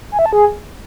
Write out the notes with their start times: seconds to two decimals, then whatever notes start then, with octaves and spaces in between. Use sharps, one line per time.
0.12 G#5
0.19 E5
0.26 A5
0.33 G#4